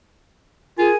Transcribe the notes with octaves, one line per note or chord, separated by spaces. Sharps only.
F4 G#4 A#4 G#5